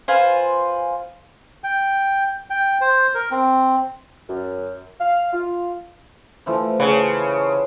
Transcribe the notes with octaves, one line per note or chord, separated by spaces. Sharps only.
F4 B4 C5 G#5
G5
G5
C5
A#4
C4
F#2
F5
F4
E3 F3 A3
C#3 B4 G#5 A5